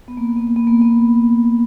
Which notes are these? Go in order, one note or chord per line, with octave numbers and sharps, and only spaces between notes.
B3
A#3
B3
A#3
B3
A#3
B3